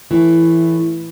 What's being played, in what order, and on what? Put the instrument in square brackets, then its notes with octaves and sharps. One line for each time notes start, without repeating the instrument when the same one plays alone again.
[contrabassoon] A2 [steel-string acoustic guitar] E3